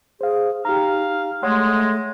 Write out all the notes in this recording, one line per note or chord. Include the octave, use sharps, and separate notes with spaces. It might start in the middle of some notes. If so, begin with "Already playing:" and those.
G#4 C5 F5
D#4 G4 F5 A#5
G#3 A3 C#5 F#5 C6